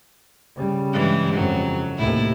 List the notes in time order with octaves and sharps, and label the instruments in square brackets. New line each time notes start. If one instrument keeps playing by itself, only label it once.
[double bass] C#3 G3
[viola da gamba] G2 E3 G#3
[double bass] F2 C#3 [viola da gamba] F#3
[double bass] D#2 C3 [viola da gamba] A2 E4